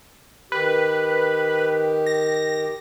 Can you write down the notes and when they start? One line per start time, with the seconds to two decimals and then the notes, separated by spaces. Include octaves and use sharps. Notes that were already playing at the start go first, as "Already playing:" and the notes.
0.52 D#3 G4 B4
2.06 A#6